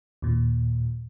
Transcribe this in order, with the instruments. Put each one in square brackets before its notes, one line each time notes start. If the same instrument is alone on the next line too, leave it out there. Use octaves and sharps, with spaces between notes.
[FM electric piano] D#2 A#2